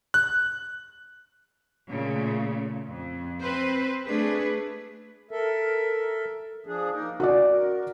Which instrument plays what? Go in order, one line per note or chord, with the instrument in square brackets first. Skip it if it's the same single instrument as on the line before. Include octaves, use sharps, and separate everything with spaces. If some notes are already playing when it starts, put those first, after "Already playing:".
[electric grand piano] F#6
[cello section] A#2 C#3 A3
F2
C4 B4 C5
A3 D4 G#4 B4
[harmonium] A4 A#4 E5
F3 D4 G#4
A#3 D#4 A#4
[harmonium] C#4 [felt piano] F#4 D5
[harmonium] A#4